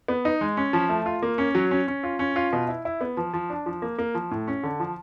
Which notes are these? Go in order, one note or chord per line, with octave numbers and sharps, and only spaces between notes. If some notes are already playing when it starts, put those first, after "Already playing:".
B3
D#4
G#3
C#4
F3
A3
F4
A#3
C#4
F#3
C#4
C#4
F4
C#4
F4
B2
E4
E4
B3
F3
F3
D4
F3
A#3
A#3
F3
A2
C#4
D3
F3